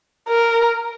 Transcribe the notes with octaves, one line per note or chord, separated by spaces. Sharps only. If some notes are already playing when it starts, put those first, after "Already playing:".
A#4